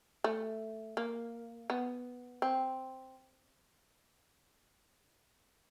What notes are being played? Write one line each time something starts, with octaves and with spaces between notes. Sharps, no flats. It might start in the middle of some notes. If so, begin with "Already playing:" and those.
A3
A#3
B3
C4